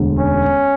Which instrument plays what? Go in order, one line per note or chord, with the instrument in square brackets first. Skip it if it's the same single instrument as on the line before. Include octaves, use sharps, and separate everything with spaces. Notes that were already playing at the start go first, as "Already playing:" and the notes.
Already playing: [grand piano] E1 D2 D3
[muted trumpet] C#4